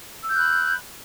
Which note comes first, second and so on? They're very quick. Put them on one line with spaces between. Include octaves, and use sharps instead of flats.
E6 G6 F#6 B5